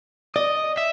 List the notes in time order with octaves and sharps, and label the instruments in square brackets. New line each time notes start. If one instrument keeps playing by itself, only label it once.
[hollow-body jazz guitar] D5 [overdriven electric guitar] D#5
[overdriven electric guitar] E5